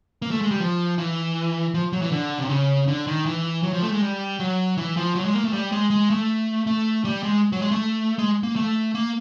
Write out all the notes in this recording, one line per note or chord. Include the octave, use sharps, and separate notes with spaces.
A#3
A3
G#3
G3
F3
E3
F3
F#3
E3
D3
C3
C#3
D3
D#3
E3
F#3
F3
A3
G#3
G3
F#3
E3
F3
F#3
G#3
A#3
A3
G3
G#3
G#3
A3
A3
G3
G#3
F#3
G#3
A3
G#3
A#3
A3
A#3